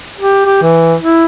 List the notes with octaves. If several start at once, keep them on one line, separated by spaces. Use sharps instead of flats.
G4
G4
E3
E4